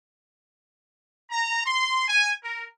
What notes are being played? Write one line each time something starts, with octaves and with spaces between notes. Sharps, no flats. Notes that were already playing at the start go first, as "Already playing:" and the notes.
A#5
C6
G#5
A#4